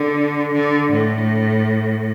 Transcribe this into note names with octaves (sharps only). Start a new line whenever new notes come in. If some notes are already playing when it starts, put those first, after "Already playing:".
Already playing: D3
D3
A2